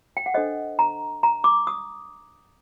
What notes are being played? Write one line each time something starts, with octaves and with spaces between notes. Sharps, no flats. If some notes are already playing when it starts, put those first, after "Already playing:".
G5
F#5
D4 A4 C5 D#5
A#5
A#5
D6
D#6